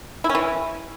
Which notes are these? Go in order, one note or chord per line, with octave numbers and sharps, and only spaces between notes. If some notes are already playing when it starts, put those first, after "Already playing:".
E4
C#4
E3